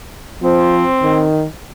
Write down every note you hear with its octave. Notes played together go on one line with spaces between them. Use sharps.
F3 C4
D#3